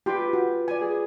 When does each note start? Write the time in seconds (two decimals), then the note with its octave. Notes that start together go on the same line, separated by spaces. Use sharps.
0.06 F4 G4 B4 G5 C6
0.33 F#4
0.68 D5 G#5
0.81 G#4